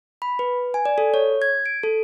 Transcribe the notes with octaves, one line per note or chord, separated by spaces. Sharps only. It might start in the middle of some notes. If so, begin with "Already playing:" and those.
B5
B4
G#5
D5
A4
C#5
G#6
D7
A4